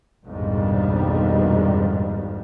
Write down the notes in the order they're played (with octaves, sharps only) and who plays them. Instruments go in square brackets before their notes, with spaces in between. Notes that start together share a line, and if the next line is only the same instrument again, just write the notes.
[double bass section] A#1 F2 G#2 B2 D#3 G3